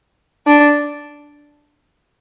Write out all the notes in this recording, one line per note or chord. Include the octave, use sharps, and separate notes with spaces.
D4